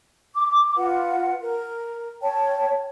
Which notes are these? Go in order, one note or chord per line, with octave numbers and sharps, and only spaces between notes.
D6
F4 B4 F#5
A#4
C#5 G5 A5